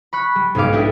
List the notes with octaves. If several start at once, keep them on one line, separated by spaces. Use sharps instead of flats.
B5 C#6 F#6
G3
B1 G#2 D#4 G4 F5 D6
D4 E4 G4 A4 D#5 E5